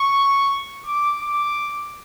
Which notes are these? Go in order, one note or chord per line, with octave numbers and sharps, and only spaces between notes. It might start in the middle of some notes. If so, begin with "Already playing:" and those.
Already playing: C#6
D6
D6